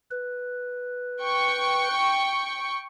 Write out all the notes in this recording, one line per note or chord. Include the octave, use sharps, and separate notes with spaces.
B4
G5 C#6